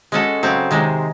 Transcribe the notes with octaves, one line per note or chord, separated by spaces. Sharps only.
G#3 C#4 F#4 A4
C#3 F#3 C4
C3 D#3 G#3